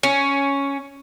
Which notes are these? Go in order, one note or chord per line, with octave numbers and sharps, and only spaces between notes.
C#4